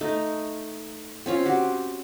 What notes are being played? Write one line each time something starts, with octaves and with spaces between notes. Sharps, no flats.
A3 D#4
C4 C#4 F4
F#4 G4